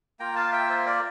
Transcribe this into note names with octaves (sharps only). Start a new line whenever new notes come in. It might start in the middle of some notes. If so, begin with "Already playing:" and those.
A#3 F4 G5 A#5
F5 A5
E5 G5
C5 E5
A#4 D5